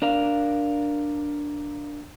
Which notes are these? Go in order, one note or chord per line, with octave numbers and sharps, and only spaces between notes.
D4 A#4 F5